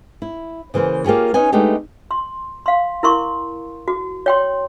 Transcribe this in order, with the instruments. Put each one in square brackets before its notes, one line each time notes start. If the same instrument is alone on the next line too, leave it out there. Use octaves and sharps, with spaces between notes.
[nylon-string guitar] E4
C#3 E3 A#3 C5
A#3 F4 G4 G#4 C#5
C#4 D#4 B4 D#5 G#5
G#3 A3 B3 D4 D#4 G4
[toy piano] C6
F5 C6
E4 A#4 C6 C#6
F#4
C#5 G5 C6